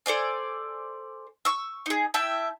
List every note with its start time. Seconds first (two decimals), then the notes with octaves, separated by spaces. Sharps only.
0.06 A4 C5 D5 G#5
1.45 C#6 E6
1.86 D#4 G#4
2.14 E4 E5 G5 A5